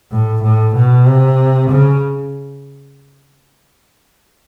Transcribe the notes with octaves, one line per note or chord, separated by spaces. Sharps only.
A2
A2
B2
C3
C#3